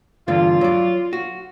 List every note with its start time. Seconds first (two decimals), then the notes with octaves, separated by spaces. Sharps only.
0.28 E2 G2 D3 F4
0.61 F#3 D5
1.13 F#4